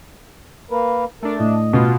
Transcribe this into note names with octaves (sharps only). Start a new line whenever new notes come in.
A#3 A#4 B4
A3 D4 A#4
A2 D#5
B2 B3 F4